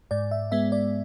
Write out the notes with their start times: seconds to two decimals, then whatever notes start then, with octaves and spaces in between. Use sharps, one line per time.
0.11 G#2 D5
0.31 E5
0.52 G#3 B3 E5
0.72 D5